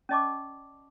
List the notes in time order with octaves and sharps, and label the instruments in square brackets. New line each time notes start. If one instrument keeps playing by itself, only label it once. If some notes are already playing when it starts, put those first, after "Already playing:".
[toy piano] C#4 D5 D#5 A5 C#6 D6